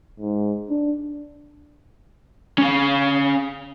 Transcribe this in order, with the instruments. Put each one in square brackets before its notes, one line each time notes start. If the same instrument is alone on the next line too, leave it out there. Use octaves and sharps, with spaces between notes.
[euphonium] G#2
D4
[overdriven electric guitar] C#4 F5